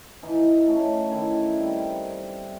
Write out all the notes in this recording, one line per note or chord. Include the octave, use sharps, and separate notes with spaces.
E3 D#4
A3 C#4
D#3 E4
G3 C4